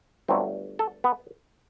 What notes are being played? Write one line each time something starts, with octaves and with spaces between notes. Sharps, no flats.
G1 G2 F#3 A3 C4
A4
B3